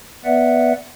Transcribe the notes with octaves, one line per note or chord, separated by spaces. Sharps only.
B3 B4 D5 E5 F#5